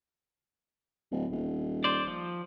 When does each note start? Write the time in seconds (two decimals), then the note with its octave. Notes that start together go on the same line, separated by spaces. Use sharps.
1.11 D1
1.31 D#1
1.84 C5 D5
2.07 F3